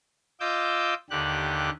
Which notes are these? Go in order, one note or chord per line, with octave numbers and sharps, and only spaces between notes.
F4 D#5 D6 E6 G6
D#2 D3 G4 F#6